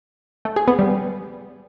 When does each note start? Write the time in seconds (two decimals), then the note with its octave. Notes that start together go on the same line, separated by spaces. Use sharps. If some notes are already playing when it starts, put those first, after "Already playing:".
0.45 A3
0.56 G#4
0.68 B3
0.79 G3